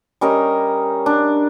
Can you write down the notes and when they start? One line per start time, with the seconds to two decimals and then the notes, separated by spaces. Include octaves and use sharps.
0.21 G3 C#4 A#4 D#5
1.06 D4